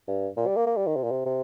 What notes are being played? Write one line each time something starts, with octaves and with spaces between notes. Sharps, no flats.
G2
A#2
G3
A#3
A#3
G3
D#3
C3
A#2
C3
C3